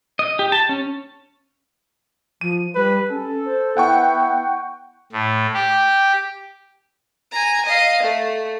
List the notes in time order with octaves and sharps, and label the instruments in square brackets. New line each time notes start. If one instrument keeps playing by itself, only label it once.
[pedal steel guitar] D#5
G4
A5
C#4
[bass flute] F3 [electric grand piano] D#7
[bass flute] G3 [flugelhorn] B4
[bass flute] C#4 [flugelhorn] A4
[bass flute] C5
[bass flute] B3 [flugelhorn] E4 [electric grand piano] F#5 G5 C#6
[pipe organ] A2
G4
[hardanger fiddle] G#5 A#5
D#5 F5
A3